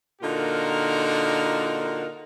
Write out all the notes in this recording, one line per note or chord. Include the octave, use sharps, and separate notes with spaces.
A#2 D3 D#4 F4 F#4 A#4